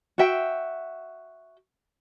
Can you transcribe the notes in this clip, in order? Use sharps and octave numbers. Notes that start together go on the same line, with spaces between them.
F#4 E5 G5